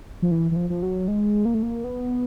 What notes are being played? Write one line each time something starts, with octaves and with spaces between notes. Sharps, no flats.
F3
E3
E3
F3
F3
F#3
G#3
A#3
A3
A#3
B3